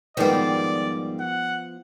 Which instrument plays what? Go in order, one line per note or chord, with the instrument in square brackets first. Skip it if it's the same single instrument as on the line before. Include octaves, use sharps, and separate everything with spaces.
[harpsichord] G#2 D#3 G3 [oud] F3 B3 [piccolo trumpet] D5
[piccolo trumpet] F#5